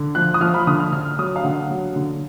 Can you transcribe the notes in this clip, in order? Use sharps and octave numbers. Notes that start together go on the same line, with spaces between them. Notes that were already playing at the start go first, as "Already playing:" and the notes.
Already playing: D3
F3 F#6
D#6
F3 F6
B5
D3 D#6
F6
D3 F6
F#3 D#6
F5
D3 F#5
F#3
D3